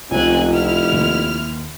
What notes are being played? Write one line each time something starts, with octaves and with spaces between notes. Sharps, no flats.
F1 C#2 C4 G#5 F#6
E4 F6
D#2